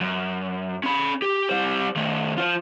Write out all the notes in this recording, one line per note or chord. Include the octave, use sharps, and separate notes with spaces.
F#2
C#4 B5
G4
G3 C5
D#3 A3
F4 C5